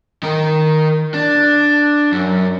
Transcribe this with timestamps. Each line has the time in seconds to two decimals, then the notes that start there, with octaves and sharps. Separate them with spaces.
0.23 D#3 A#4
1.14 D4
2.12 F#2